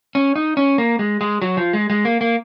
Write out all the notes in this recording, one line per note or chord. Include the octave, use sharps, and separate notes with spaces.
C#4
D#4
C#4
A#3
G#3
G#3
F#3
F3
G#3
G#3
A#3
A#3